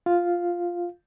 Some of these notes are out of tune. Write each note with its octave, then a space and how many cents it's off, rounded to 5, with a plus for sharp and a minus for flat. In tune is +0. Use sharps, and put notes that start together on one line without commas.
F4 +0 F5 +0